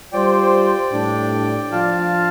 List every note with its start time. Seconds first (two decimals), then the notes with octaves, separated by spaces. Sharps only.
0.13 G3 F4 C5 D5 G5
0.93 A2 G3 D4
1.72 F3 D4 F4 F5 A5